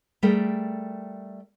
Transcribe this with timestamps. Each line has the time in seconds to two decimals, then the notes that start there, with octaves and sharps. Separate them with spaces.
0.22 G3 A3 G#4 A#4 G5